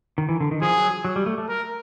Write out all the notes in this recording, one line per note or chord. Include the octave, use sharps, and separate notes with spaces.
D#3
E3
D3
D#3
F3 G#4
F#3
F#3
G3
A3
A3
A#4